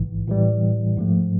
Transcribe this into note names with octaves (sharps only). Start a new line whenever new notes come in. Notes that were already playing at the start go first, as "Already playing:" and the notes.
Already playing: A1 G#2 E3
A2 E3 G3
G#2 F3 A3